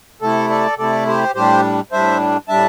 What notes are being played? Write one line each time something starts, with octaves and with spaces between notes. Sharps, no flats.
C3 A3 E4 A4
A4 D5
C3 A3 E4 A4 D5
G4 C5
A2 G3 D4 G4 C5
A2 G3 D4 C5 E5
A2 G3 D4 E5 A5